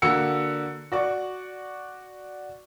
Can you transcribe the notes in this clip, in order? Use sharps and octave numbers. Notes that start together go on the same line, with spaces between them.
D3 A#3 F#4 E6 C#7
F#4 D5 C#6